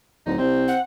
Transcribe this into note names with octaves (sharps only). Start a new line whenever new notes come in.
D1 D#4
C2 C4
F#5